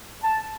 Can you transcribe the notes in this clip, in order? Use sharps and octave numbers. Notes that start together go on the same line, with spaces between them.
A5